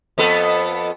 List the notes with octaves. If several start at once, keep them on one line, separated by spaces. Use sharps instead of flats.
F2 B3 A4